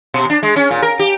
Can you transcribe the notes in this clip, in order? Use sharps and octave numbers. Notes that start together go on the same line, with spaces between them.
B2
D4
G#3
C#4
A#2
A#4
G4